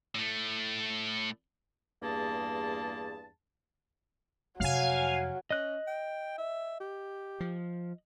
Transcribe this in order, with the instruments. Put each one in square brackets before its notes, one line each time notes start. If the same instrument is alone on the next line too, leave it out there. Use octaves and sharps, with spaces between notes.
[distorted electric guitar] A2 A3
[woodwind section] E2 G2 A#3 G#4 A5
[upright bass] F2 C3 [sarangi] F#3 [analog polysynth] F5 G#5
[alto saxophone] C#4 [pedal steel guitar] D#5 F#6
[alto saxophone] G5
E5
G4
[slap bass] F3